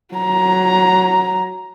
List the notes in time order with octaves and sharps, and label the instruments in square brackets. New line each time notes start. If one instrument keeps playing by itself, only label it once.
[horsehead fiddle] F#3 A#5